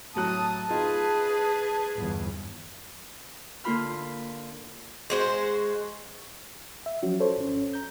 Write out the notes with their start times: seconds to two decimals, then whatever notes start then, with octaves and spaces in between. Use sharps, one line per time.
0.16 A2 F#3 A5 D#6 F#6
0.70 D#4 F4 G#4 B4
1.96 G1 E2
3.64 D3 A#3 F4 B5 F6
5.10 G#3 F#4 C5
6.86 E5
7.03 F3 F#3 C#4 F#4
7.20 A4 C5 C#5
7.38 G#1 C#4
7.73 A#5 G6